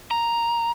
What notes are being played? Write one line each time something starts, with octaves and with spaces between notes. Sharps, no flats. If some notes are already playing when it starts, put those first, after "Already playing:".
A#5